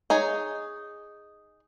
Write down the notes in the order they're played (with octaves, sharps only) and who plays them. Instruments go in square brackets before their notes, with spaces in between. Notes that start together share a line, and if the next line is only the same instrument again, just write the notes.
[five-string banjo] D#4 G#4 C#5